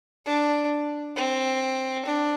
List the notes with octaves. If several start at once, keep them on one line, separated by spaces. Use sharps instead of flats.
D4
C4
D4